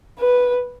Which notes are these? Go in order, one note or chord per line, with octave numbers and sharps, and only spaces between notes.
B4